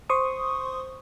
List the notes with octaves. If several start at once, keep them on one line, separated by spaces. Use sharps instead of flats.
C5 C6 C#6 D#6